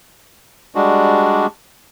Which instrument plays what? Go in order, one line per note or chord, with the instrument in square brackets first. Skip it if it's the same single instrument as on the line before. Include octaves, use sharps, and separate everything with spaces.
[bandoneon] G3 G#3 D4 F#4